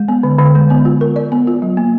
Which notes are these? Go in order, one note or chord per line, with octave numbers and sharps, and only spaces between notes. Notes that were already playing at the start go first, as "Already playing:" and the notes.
Already playing: G#3
B3
D3
D3
G#3
B3
F4
A#4
D5
B3
F4
F#3
A#3